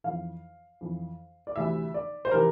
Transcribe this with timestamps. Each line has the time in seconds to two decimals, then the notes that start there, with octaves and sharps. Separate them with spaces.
0.04 F2 E3 F5
0.81 F2 E3
1.47 D5
1.56 D2 C3 E3 E5
1.94 D5
2.25 C5
2.31 C3 E3 A#4